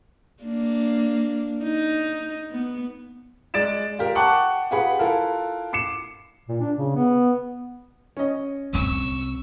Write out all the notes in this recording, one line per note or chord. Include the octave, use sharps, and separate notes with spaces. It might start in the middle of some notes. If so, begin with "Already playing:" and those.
A#3 D4
D#4
B3
G#3 D5 A6 D7 E7
F4 G4 A#4
F#5 G5 A5 C#6 D6 F#6
F4 G4 G#4 B4 F#5 B5
E4 F4 A4 A#4
D6 C7 C#7 E7
A#2
D4
C#3
B3
C#4 D#5
C2 C3 C#6 E6